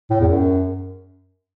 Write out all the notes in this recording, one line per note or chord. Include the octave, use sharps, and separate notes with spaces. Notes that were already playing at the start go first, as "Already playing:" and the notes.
A2
E2
F#2